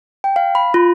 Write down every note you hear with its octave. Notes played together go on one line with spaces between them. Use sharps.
G5
F5
B5
F4